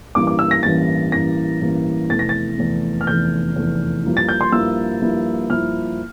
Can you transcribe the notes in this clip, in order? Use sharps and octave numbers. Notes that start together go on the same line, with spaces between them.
A1 G2 E3 A#3 D6
D6
E6
A#6
A1 G2 E3 A#3 A6
A1 G2 E3 A#3 A#6
A1 G2 E3 A#3
F1 E2 E3 A3 A6
A#6
A6
F1 E2 E3 A3
F6
F1 E2 E3 A3 G6
F1 E2 E3 A3
G2 F3 A#3 E4
A6
G6
C6
G2 F3 A#3 E4 E6
G2 F3 A#3 E4
G2 F3 A#3 E4 F6